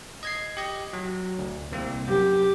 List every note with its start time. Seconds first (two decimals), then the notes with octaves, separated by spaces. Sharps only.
0.23 D#5 G#6 C7
0.57 G4 D#5
0.93 F#3
1.39 D2
1.72 C2 A#3 C4
2.08 F#2 G4